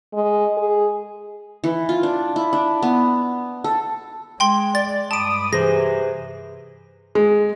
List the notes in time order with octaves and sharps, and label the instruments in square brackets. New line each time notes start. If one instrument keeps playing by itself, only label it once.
[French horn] G#3
G#4
[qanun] E3
F4
D4
E4
D4
B3
A4
[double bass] G#3 [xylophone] G5 C6
[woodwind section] D5 [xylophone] A6
[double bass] G2 [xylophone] A5 D7 [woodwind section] B5 D6 D#6
[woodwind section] C3 E3 [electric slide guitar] G#4 C5 [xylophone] A#6
[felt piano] G#3